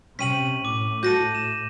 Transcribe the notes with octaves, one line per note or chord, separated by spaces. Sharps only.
C3 C#4 G5 B6 D#7 F#7
A2 D6
F#4 A4 G6 A#6 D#7
E7